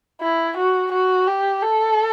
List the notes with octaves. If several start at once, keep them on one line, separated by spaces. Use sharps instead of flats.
E4
F#4
F#4
G4
A4